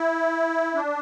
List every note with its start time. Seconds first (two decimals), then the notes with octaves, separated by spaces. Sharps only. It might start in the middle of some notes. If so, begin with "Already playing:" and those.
Already playing: E4
0.75 D4